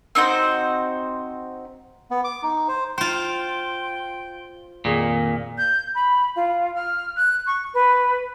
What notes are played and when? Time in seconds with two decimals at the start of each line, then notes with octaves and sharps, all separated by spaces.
0.15 C4 D#4 F#4 C5
2.11 B3
2.24 D6
2.43 D#4
2.68 C5
2.98 F4 C5 G5 C6
4.85 F2 A#2 D#3 G#4
5.57 G6
5.94 B5
6.35 F4
6.75 F6
7.16 F#6
7.46 C#6
7.73 B4